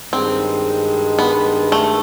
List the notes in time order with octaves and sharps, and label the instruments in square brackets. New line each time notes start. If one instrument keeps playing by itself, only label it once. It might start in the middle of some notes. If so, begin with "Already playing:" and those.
[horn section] G2 D#3 G#3 [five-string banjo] C4
[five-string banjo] B3
A3